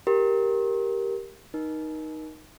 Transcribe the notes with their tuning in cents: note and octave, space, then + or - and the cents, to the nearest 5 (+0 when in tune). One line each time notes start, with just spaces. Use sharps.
G4 +0 A#4 +0
D#4 +0 A#4 +35